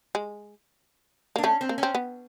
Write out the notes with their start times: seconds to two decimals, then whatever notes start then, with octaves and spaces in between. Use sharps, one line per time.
0.15 G#3
1.36 A#3
1.38 D4
1.43 A3 C#4
1.61 C4
1.69 A#3
1.78 C#4
1.83 C4
1.95 B3